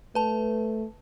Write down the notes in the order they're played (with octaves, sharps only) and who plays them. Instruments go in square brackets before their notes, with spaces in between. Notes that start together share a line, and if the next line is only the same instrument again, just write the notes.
[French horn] A3 [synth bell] B4 A5